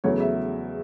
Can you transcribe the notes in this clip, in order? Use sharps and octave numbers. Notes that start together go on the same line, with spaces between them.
E2 C#3 F#3 A3 C#5
E5